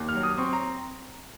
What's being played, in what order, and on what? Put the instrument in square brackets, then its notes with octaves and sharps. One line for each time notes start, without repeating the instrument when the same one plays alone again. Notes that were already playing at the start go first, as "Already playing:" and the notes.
Already playing: [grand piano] D#2
F6
F#3
D#6
C4 C#6
A#5